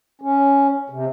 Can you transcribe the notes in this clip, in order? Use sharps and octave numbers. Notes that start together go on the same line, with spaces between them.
C#4
C3